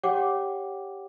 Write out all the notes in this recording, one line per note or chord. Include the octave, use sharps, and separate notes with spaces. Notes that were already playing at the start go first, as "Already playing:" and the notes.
G4 C#5 F#5 G5 D6